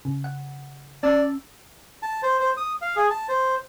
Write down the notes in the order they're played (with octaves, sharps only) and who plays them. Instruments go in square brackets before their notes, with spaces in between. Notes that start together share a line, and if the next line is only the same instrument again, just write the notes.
[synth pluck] C#3
F#5
[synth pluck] C#4 A5 E6 [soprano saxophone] D5
[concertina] A5
C5
C5
D#6
F5
G#4
A5
C5